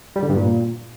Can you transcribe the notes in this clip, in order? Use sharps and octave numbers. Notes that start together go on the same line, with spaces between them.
G3
D3
G2
A#2